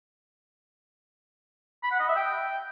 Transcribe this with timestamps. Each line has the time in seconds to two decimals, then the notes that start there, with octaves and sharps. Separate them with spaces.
1.83 B5
1.91 F#5
2.00 D#5
2.08 E5
2.16 G5